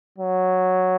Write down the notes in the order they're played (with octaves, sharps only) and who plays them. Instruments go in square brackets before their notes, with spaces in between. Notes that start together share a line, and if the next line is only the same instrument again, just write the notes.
[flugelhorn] F#3